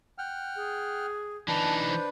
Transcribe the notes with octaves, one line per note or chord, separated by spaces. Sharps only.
F#5 G5 F6
G#4
E3 D4 D#4 B4 A5
C5